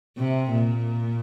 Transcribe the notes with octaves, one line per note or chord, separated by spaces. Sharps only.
C3
A#2